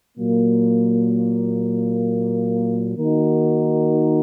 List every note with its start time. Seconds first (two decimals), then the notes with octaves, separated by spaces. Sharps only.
0.18 A#2 F#3 A#3
2.97 D#3 A#3 D#4 F#4 A#4